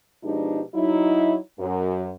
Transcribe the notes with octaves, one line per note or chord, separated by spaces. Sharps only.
B2 F3 G#3 D4 D#4 G4
F#3 D#4 E4
F#2